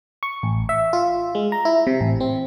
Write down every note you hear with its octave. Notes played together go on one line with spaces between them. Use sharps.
C#6
A1
E5
F4
G#3
A#5
E4
C3
A1
C4